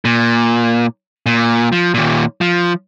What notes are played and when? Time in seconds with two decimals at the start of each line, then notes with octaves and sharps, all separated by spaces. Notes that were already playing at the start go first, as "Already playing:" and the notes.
0.05 A#2
1.26 A#2
1.72 F3
1.94 D#2 A#2
2.41 F3